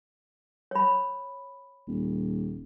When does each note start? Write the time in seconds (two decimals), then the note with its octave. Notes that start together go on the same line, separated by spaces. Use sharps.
0.71 C#5 B5
1.88 D#1